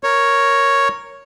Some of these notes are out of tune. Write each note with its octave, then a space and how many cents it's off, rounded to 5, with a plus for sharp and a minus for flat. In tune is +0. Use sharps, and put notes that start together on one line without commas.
A#4 +0 C#5 +0